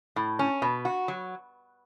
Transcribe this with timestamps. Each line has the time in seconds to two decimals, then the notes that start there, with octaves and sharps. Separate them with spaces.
0.16 A2
0.39 C#4
0.62 B2
0.85 F#4
1.08 F#3